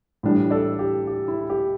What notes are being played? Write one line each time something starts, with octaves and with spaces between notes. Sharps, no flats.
A2 E3 G3 D4
A4 D5
G4
G4
E4
G4